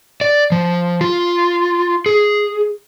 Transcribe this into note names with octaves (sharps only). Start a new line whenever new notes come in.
D5
F3
F4
G#4